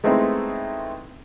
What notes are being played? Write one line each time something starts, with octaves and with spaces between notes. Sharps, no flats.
G#3 A3 B3 C4 D#4 E4